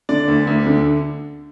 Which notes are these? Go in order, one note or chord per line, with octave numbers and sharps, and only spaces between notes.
D3 D5
D2
D2
D3